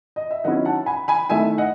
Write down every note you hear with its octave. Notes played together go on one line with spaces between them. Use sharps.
D#5
E5
D#3 F#3 C#4 E4 D#5 F#5
F#5 A5
G#5 B5
G#5 B5
D#3 A3 E4 E5 G#5
D#5 F#5